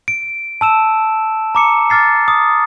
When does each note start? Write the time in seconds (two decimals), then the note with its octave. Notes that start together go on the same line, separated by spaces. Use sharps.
0.08 D7
0.61 A5 E6 E7
1.55 A#5 D6 C#7
1.90 D6 F6 A6 C7
2.28 D#6